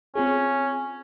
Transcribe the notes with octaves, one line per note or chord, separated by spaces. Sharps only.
C4 C#4 F4 G#4